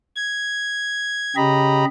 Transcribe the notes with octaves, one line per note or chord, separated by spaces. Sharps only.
G#6
C#3 G4 D#5 A#5 B5